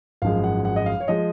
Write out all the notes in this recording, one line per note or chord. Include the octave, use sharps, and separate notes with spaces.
G#1 F#2 F3 G#3 F5
F#5
F#5
D#5
F5
C#5
F3 G#3 D#5